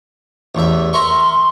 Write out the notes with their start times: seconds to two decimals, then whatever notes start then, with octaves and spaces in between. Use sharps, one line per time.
0.55 A1 E2 E5
0.93 A#4 E5 C6 C#6